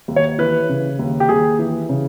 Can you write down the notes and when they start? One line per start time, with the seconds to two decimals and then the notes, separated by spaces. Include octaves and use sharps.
0.08 D#2
0.16 C#5
0.38 E3 B4
0.69 C#3
0.99 D#2
1.20 G4
1.29 D#2 G#4
1.59 E3
1.89 C#3